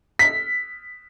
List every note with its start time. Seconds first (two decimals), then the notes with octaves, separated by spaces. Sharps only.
0.19 B6